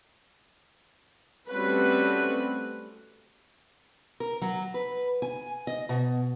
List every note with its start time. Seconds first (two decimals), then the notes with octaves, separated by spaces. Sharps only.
1.50 G3 A3 C4 C#4 F#4 B4
4.20 A#4
4.42 F#3
4.74 B4
5.22 G#5
5.67 D#5
5.89 B2